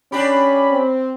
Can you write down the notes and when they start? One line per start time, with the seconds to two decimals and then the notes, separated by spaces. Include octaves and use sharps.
0.12 C#4 D4 G4 B5
0.71 C4